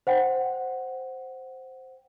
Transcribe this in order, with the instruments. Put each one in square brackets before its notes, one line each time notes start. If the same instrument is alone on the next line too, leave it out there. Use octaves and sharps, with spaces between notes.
[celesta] C5 F#5 G5